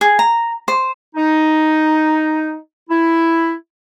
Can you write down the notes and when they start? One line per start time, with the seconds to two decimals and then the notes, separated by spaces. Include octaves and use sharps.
0.01 G#4
0.19 A#5
0.68 C5
1.15 D#4
2.90 E4